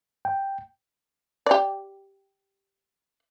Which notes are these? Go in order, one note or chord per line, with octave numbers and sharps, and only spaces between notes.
G5
G4 D5